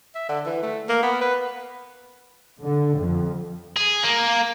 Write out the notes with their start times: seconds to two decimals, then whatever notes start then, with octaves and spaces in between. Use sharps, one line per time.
0.15 E5
0.29 D3
0.46 E3
0.63 A3
0.89 A#3
1.03 B3
1.21 B4
2.62 D3
2.97 F2
3.77 G#4
4.04 A#3